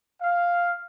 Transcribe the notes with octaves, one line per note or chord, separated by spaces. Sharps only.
F5